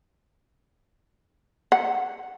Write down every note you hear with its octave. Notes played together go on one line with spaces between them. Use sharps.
F#5